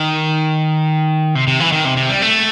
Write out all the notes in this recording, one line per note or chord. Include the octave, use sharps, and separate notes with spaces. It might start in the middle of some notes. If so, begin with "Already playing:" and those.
Already playing: D#3
C3
C3
E3
D#3
C3
C3
G3
A3